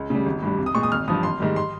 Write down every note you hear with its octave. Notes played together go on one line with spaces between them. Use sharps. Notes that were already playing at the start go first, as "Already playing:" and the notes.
Already playing: C#2
C#3 G3
G#1
G2 G3
C2
D#6
A#2 G#3 C#6
D#6
G#1 F6
G2 F3 D#6
G#1 C6
G#2 D#3 G3
C6